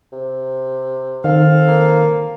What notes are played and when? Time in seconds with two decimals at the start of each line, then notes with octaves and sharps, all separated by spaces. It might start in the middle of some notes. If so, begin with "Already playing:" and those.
0.12 C3
1.24 D#3 C4 A4 F5
1.68 A#3